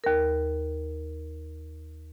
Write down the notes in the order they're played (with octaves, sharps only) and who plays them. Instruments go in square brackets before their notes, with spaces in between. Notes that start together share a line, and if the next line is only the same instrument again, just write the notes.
[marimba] D#2 A#4